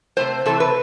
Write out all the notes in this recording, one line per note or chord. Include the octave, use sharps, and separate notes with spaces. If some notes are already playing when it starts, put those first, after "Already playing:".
C3 E3 A3 C4 C5
C3 E3 A3 C4 A4
B4